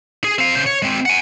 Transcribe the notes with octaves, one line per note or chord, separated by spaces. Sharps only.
G#4
C4 F5
C#3 C5
C#5
G#3 C4
F#5 G#5